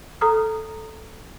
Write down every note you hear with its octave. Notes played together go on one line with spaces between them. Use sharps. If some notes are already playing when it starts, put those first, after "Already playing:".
A4 A#5 D#6 F6